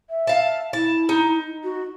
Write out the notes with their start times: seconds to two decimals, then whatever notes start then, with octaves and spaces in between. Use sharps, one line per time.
0.10 E5
0.27 F5 A5
0.73 E4 A5
1.09 D#4
1.64 F#4